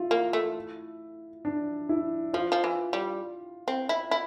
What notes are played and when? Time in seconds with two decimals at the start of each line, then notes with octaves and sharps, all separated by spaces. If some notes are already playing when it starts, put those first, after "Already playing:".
Already playing: E4 F4
0.11 A#3
0.33 A3
1.45 D4
1.89 E4
2.33 F3 F4
2.52 F3
2.64 E3
2.93 G3
3.68 C4
3.89 E4
4.11 E4